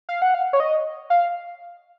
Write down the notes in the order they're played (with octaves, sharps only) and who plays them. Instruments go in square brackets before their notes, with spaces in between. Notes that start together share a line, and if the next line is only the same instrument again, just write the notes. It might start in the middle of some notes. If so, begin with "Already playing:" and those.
[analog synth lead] F5
F#5
F5
C#5
D#5
F5